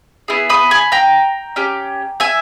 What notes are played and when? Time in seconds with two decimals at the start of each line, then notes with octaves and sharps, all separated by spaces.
0.28 B3 E4 G#4
0.50 B5 D#6
0.71 G#5 B5
0.92 G5 A#5
1.56 C#4 G4
2.20 E5 G#5